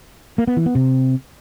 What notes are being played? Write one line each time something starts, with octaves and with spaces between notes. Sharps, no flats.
A#3
B3
E3
B3
C3